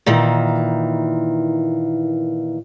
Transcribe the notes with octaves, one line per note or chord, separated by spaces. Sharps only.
A#2 D#3 E3